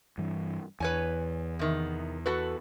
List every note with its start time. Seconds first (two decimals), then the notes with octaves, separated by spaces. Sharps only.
0.18 G2 E3
0.80 E2 B4 C#5 G#5
1.59 C3 D#3
2.26 F#4 A4 B4